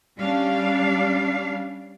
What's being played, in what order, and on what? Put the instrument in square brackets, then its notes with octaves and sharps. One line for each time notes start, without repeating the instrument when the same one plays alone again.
[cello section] G3 C#4 D4 F5